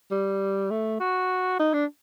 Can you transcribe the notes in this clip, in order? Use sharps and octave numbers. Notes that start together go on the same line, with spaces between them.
G3
A3
F#4
D#4
D4